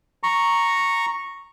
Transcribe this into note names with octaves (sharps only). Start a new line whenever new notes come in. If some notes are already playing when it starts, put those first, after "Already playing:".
A#5 C#6